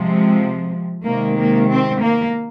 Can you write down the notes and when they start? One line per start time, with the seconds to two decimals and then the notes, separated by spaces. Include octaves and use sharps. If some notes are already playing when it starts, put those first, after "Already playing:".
Already playing: C3 F3 G#3
1.04 C3 D#3 G#3 A#3
1.36 A#3
1.68 C4
2.01 A#3